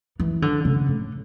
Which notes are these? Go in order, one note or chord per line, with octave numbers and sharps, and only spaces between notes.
E3
D3
C#3
A2